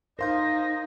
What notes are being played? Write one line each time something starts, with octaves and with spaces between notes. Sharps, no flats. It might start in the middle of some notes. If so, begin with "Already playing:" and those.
D#4 A#4 C5 F5 C6 G6 A#6